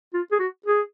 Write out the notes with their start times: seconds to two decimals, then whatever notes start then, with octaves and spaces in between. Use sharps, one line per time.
0.14 F4
0.32 G#4
0.39 F#4
0.66 G#4